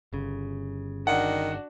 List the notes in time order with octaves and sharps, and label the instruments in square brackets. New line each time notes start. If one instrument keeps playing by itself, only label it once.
[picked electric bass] G1 C#3
[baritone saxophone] D#3 [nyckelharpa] D4 F#4 [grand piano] F#5